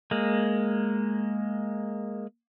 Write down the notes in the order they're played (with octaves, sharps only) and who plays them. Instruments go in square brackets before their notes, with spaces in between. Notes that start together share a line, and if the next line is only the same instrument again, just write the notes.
[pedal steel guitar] G#3 A#3